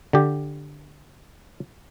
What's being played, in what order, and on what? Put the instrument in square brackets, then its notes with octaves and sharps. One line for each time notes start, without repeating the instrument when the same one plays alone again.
[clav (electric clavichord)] D3 G4